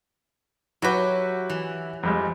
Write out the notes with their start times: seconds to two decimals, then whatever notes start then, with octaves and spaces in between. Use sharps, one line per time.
0.82 F#3 E4 F#4 G4 B4
1.49 E3
2.03 F2 G3 G#3